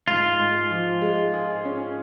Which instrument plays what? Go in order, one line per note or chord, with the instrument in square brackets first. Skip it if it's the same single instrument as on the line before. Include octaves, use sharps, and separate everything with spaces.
[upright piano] G#2 [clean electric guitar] F4
[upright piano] G#2
F3
G#3
G#4
C#4